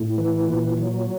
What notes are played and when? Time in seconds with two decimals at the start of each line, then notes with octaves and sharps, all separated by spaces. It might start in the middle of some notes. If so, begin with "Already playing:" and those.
Already playing: A2
0.18 E3
0.47 A#2
0.78 F#3